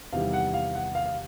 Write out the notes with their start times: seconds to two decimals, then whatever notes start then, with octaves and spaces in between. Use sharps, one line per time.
0.12 E2 C3 D#3 G3 F5
0.33 F#5
0.54 F5
0.75 F#5
0.95 F5
1.06 F5